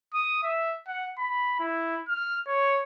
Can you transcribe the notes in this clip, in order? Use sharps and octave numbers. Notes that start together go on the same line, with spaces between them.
D#6
E5
F#5
B5
E4
F6
C#5